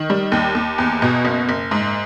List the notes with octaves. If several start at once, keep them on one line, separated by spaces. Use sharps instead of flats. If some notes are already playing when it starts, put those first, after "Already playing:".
Already playing: D#3
G3
D#2
D#2
E2
B2
F#1
F#1
G#2